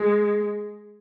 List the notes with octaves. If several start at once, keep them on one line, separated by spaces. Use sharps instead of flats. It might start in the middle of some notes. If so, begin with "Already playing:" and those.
Already playing: G#3